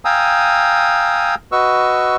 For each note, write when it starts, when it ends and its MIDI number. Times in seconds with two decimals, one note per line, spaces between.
0.05 1.35 77
0.05 1.35 79
0.05 1.35 80
0.05 1.35 82
0.05 1.35 87
0.05 1.35 88
1.52 2.17 66
1.52 2.17 71
1.52 2.17 75
1.52 2.17 85
1.52 2.17 88